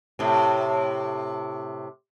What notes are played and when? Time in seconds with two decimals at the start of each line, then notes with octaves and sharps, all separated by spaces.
0.19 A2 C3